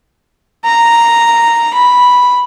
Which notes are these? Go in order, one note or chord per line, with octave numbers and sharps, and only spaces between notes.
A#5
B5